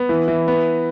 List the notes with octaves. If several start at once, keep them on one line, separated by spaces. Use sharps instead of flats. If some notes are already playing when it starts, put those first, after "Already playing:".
Already playing: B3
E3
E3
B3